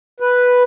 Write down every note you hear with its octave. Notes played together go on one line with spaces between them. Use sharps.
B4